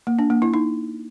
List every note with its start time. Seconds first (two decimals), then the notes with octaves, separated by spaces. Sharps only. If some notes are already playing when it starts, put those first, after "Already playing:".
0.07 A#3
0.19 D4
0.30 A#3
0.42 E4
0.54 D#4